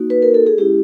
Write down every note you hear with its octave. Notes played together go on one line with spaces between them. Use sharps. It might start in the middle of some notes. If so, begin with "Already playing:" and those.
Already playing: A#3 D#4 F#4
B4
A#4
A4
G#4
G#3 C#4 E4 G4